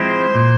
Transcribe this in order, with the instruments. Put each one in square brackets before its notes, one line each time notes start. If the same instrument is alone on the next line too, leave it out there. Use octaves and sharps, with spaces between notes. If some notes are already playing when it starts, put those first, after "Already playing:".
Already playing: [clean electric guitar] F3 G#3 C4 E4 [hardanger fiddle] C5
[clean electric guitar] A#2